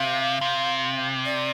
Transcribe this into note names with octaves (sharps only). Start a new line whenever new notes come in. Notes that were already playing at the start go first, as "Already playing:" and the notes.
Already playing: C3 F5
C3
D5